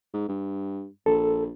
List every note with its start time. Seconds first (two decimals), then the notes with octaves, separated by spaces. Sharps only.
0.14 G#2
0.28 G2
1.06 A#1 A4